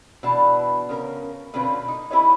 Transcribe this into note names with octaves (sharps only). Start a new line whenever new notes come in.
B2 E3 D4 A5
C#3 C#4 A#4
B2 D3 C4 C#4 F4 B4
D#4
E4 G4 B4 C#5 D#5